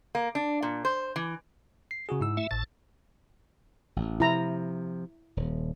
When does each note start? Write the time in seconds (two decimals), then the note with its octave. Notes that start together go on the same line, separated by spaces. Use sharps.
0.15 A#3
0.35 D4
0.62 A#2
0.85 C5
1.16 E3
1.91 C7
2.09 C#3 F#4 G#4
2.21 G#2 E4 E6
2.37 A3 E4 E5
2.51 G#1 A2 A5 A6
3.96 A1
4.20 C3 F3 E4 A#5
5.37 D#1